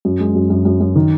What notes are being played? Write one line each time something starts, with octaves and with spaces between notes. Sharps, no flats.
F#2
G#3
F#2
F#2
F#2
F#2
D#3